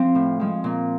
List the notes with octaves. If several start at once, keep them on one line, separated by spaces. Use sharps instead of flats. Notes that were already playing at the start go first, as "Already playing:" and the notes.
Already playing: F3 C4
A2
F3 G#3
A#2